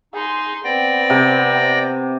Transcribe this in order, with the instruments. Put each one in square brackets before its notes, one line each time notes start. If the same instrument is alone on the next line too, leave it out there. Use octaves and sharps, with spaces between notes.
[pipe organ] D#4 [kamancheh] G#4 C6
[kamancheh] B3 C4 [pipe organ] D5 G5 A#6
[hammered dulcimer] C3